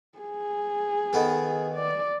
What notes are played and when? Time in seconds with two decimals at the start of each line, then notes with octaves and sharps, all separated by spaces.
0.18 G#4
1.13 D#3 B3 A4
1.75 D5